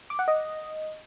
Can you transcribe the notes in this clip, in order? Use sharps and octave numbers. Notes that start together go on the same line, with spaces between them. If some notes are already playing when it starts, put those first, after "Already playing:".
D6
F#5
D#5